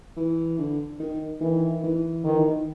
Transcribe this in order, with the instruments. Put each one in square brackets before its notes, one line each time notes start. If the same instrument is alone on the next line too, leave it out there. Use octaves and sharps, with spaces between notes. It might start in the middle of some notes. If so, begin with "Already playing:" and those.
[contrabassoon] E3
D3
D#3
[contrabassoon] D#3 [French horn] E3
[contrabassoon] E3
[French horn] D#3 [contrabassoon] E3
[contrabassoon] D#3